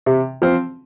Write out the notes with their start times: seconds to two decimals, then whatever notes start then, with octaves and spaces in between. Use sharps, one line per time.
0.06 C3
0.42 F3 C4